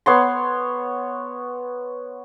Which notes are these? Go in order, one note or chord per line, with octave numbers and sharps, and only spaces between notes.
B3 C#5 C6